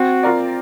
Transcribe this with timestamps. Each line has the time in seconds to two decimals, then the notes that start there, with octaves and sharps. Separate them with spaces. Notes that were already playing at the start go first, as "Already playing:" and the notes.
Already playing: C4 F#4
0.23 F4 A#4 D5